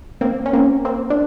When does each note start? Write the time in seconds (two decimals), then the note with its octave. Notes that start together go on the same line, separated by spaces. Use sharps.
0.21 A#3 C4
0.46 C#4
0.53 A#3 C4
0.85 A#3 C4
1.10 D4